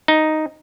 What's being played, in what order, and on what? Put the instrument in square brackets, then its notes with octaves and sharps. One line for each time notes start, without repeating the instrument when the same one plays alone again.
[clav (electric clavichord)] D#4